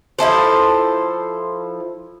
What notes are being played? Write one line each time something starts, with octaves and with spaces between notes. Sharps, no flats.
F3 E4 A4 C5